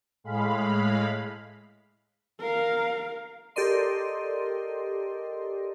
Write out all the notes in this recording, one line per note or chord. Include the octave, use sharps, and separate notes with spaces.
A2 G#3 F5 B5
A#4 F5
G4 A4 A#4 D5 D#5 C6